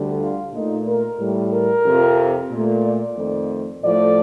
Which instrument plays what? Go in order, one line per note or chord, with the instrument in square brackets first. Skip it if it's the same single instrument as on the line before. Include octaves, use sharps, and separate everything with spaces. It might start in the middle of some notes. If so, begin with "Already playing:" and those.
Already playing: [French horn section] D2 D3 G3
F4
A#2 A3 D#4
A#4
A2 G3
A#4
F2 C3 F3
A#2 A3
D5
F2 D#3 A3
A2 F3 A3 D5